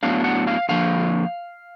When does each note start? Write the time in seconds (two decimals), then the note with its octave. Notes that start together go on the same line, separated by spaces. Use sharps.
0.03 A2 F#3 B3 D4 F5
0.24 F#5
0.47 F5
0.69 F2 D3 F3 A#3 F5